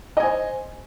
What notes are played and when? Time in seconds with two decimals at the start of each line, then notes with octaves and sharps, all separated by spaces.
0.17 D#5
0.20 G#5
0.23 C5